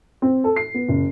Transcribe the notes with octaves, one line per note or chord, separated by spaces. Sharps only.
C4
A4
C7
B3
F#1